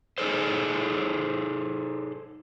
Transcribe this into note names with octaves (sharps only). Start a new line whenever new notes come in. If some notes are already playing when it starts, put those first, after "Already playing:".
D#4 G#4 A4 C5